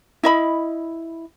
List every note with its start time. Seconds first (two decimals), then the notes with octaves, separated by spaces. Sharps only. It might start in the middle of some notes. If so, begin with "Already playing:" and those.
0.23 E4 D#5 B5